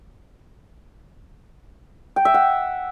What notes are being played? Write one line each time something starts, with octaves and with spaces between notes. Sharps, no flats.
G5
E5
F#5